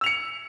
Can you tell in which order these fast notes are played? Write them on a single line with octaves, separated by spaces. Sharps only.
E6 F7 C#7